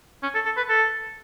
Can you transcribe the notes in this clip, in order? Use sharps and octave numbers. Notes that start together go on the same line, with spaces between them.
C#4
A4
A4
B4
A4